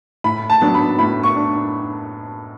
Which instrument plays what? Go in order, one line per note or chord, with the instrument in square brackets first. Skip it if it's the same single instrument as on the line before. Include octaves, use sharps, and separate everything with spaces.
[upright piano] A2 B5
A5
F#3 B3 D4
B5
A2 B5
C#6
D4